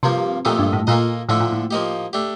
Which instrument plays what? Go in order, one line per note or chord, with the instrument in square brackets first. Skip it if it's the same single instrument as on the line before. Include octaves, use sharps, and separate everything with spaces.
[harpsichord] G2 F3 A#3 F4 [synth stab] C3
[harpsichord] F2 D#3 A3 D#4 G4 [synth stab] A#2
[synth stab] G2
A2
[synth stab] A#2 [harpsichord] A#3 F4 A4 D#5
[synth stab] A2 [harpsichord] D3 F3 A3 D4
[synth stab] A#2
A2
[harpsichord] F3 A#3 D#4 G4
A3 D4 G4